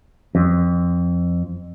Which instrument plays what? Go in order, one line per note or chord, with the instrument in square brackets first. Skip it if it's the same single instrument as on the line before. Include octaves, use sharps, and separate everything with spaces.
[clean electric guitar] F2